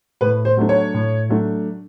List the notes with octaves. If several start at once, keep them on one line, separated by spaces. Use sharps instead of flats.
A2 B4
C5
F#3 A3 D4
C#5
A2
F#3 A3 D4